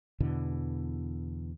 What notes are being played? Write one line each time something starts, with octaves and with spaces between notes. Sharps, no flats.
E2 B2 D3 E3